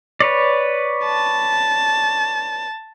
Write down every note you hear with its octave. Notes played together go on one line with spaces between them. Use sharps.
B4 C#5 D5
A5